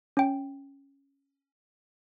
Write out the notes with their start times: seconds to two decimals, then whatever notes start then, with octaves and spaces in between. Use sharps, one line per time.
0.17 C#4 G5